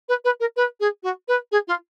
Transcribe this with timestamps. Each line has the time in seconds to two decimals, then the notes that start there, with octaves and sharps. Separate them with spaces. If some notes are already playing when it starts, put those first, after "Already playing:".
0.09 B4
0.25 B4
0.40 A#4
0.56 B4
0.80 G#4
1.03 F#4
1.28 B4
1.52 G#4
1.68 F4